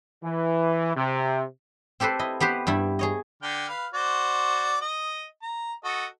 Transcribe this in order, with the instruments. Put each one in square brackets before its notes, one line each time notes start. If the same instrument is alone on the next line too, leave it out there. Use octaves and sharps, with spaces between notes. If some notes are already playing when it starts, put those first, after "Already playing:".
[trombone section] E3
C3
[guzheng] C4 G4 A4 B4 C5
E4 D#5
B3 G4 B4 C5
G2 G3 E4
G#4 C#5 D#5
[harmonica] D3 G5 F6
B4 F5
F#4 C5 D5
D#5
A#5
F#4 A4 D#5